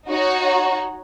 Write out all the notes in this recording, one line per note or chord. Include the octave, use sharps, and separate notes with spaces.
D#4 F#4 C#5